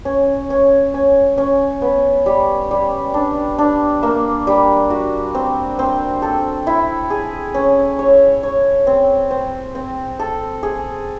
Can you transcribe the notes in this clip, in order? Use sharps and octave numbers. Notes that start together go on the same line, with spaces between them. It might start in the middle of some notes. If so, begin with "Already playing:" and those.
C#4
C#4
C#4
C#4
B3
G3
G3
D4
D4
A#3
G3
F#4
C4
C4
A4
E4
G#4
C#4
C#5
C#5
C4
C4
C4
A4
G#4